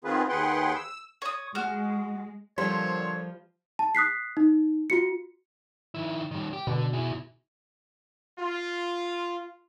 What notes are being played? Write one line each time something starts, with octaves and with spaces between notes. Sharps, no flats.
D#3 B3 C4 F4 G#4 B4
D#2 G#4 B4 F#5 G5 C6
E6
C#5 D#6
G#3 F#4 F6
A#2 D3 F3 G3 C5 C#5
A5
D#6 F#6 B6 C7
D#4
F4 F#4 C#7
D#3 E4
D#3 G3
G4
B2 D3
E4 G#4
F4